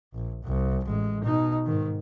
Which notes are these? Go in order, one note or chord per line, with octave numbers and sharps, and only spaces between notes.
A#1
C2
A1 G#3
B2 D#4
G#2 D#3